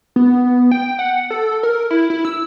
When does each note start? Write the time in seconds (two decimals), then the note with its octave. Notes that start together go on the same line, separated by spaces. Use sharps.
0.16 B3
0.71 G5
0.99 F#5
1.30 A4
1.63 A#4
1.91 E4
2.10 E4
2.25 E6